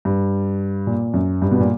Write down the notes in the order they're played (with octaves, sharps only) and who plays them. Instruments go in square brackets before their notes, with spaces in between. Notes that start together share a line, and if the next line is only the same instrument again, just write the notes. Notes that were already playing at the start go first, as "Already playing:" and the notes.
[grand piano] G2
A#2
F#2
G2
B2
A#2